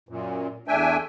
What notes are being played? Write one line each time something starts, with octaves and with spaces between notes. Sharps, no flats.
F#2 A#2
E2 A3 D4 E5 G5 G#5